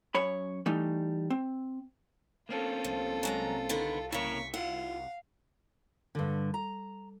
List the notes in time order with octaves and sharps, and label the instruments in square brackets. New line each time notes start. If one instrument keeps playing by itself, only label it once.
[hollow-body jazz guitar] F#2 C#5 B5
E3 G3 A3 D#4
C4
[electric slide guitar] A#3 C4 C#4 [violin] F4 A4
[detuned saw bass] C2 [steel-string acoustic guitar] F3
[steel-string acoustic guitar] F#3 G#3 A#5
D3 D#3 B3
[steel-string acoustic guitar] C#3 A#3 [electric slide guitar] E4 C#5 [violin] C#6 B6
[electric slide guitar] E4 F4 [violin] F5 [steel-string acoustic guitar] F#5
[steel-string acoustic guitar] G2 D3
A#5